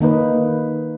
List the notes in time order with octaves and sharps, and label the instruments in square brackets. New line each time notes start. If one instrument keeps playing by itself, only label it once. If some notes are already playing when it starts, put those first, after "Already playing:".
[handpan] D#3 A#3 D#4 B4